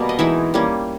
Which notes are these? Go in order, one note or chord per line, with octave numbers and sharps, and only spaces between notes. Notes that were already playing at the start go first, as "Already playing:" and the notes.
Already playing: B2 G3 A#3
D#5
E3 G#3 D#4 E4 E5
G3 A#3 C#4